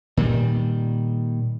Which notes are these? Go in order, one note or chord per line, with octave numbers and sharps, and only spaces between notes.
A#2 D#3 G3